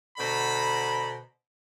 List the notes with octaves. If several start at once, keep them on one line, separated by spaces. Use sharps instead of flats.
B2 D3 C5 A#5 B5